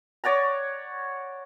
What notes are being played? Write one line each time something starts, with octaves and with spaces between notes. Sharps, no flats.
C#5 D5 F#5 A#5